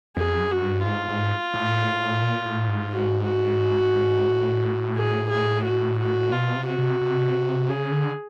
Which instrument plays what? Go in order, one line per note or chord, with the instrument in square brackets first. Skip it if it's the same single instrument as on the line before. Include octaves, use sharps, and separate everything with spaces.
[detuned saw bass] F2 [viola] G#4
[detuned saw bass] F#2
[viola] F#4
[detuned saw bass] G2
[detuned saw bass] G#2 [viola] F4
[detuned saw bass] G#2
A2
A#2
A2
G#2
[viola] F#4
F#4
[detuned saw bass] A2
[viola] G#4
G#4
F#4
F#4
[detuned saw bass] B2 [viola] F4
[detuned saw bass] C3
[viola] F#4
[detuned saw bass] C3
C3
[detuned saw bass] C#3 [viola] G#4
[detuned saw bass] D3